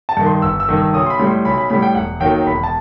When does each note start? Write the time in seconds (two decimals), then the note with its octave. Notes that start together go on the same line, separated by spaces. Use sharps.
0.09 A5
0.17 G2 D#3
0.26 C6
0.42 G1 E6
0.60 E6
0.69 G2 D#3
0.77 E6
0.93 B1 D#6
1.06 C6
1.10 B5
1.20 A2 G3
1.27 C6
1.45 B1 B5
1.58 B5
1.70 A2 G3 B5
1.82 G5
1.95 E1 F#5
2.20 D#2 D#3 F#3 G5
2.46 E1 B5
2.63 A5